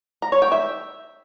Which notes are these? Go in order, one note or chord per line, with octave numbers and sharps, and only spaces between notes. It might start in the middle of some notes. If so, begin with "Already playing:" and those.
A#5
C#5
G5
E5